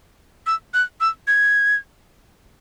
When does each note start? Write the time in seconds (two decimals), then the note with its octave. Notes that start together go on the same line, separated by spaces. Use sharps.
0.47 E6
0.74 F#6
1.00 E6
1.27 G#6